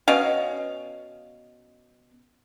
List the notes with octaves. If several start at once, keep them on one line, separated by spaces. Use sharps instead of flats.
B2 C#4 D#5 F5